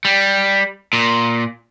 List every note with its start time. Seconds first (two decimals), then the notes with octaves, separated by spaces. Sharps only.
0.05 G3
0.93 A#2